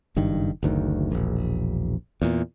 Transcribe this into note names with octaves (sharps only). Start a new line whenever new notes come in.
F#1 G2 D#3
F#1 D2 D#3
E1 A#1
E2 A#2